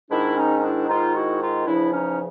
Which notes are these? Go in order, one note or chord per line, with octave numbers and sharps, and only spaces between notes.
G#2 D#3 D4 E4
C#4 D#4
D#4
D4 E4
G#2 D#3 D#4 F4
E4 F#4
D#4 F4
E2 C#3 F3 D4 E4
C#4 D#4